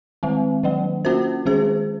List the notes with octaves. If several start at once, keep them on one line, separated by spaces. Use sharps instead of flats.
D#3 G#3 C4
D#3 F#3 A#3
A#3 C#4 F#4 C5
D#3 G#3 C#4 G#4 C5